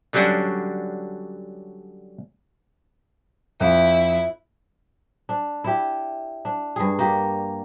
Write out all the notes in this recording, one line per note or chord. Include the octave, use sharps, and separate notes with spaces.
D3 F#3 G3 C#4 D4 F#4
F2 E4
D4
E4 G4
D4
G2 G#4
A#3 G4